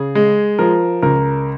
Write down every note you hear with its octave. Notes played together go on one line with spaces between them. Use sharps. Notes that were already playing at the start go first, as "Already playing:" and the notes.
Already playing: C#3 G#4
G#3
F3 A#4
C#2 A#4